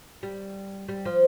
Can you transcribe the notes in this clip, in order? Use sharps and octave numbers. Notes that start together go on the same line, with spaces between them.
G3
G3
F3